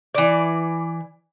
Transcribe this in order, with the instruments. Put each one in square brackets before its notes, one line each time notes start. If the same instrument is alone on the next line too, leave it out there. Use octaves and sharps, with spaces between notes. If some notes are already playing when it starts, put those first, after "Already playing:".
[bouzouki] E3 D5